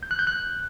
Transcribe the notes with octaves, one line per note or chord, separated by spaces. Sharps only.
G6
F#6
G6
F#6